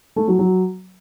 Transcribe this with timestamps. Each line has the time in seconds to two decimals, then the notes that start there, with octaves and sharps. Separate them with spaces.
0.16 A3
0.27 F#3
0.39 F#3